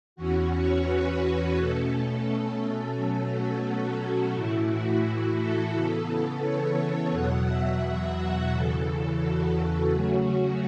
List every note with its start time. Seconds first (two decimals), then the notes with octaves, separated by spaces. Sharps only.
0.16 E2 E3 C#4 F#4
0.52 C#5
0.85 B4
1.55 B2 A3 C#4 A4
2.59 A4
2.94 B2 F#3 A3 C#4
3.29 F#4
3.64 F#4
4.33 A2 E3 A3 E4
4.68 F#4
5.38 A4
5.73 C#3 E3 B3
6.41 C#5
7.11 E2 B2 F#3 F#5
7.46 E5
8.16 F#4
8.50 E2 C#3 E3 A4
9.20 F#4
9.54 F#4
9.90 C#3 F#3 A3 C#4